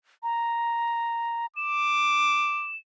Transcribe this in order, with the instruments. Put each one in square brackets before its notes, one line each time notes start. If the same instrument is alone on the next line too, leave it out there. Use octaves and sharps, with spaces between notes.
[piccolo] A#5
[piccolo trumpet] D6 [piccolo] E7